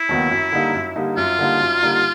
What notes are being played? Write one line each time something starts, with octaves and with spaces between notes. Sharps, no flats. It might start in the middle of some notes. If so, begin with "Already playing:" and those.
Already playing: E4
D#2 D#3 F#3 B3
F#2
D3 G3 A#3 D#4
F#2
D3 G3 A#3 D#4
F#2 F4
D3 G3 A#3 D#4
F#2
D3 G3 A#3 D#4